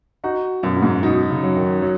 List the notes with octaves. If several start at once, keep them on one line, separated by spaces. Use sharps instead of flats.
D#4 F#4
F#2 B2
B2
G#2
B2 D#4
C#3
F#3
D#3
F#3